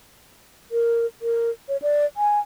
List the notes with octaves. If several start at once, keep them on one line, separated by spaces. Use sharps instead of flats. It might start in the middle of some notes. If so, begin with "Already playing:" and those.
A#4
A#4
C#5
D5
G#5